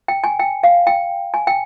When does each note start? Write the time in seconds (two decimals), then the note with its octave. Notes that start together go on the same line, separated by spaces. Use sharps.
0.08 G5
0.24 G#5
0.40 G5
0.63 F5
0.87 G5
1.34 G#5
1.47 G5